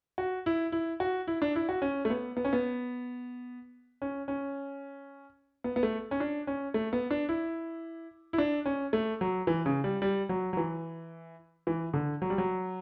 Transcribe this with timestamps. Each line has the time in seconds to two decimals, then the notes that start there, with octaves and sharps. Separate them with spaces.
0.18 F#4
0.46 E4
0.72 E4
1.00 F#4
1.28 E4
1.42 D4
1.56 E4
1.69 F#4
1.82 C#4
2.05 A3
2.10 B3
2.37 B3
2.45 C#4
2.53 B3
4.02 C#4
4.28 C#4
5.64 B3
5.76 B3
5.83 A3
6.11 C#4
6.20 D4
6.47 C#4
6.74 A3
6.93 B3
7.11 D4
7.29 E4
8.33 E4
8.38 D4
8.66 C#4
8.93 A3
9.21 F#3
9.47 E3
9.66 C#3
9.84 G3
10.02 G3
10.29 F#3
10.53 F#3
10.57 E3
11.67 E3
11.94 D3
12.22 F#3
12.30 G3
12.38 F#3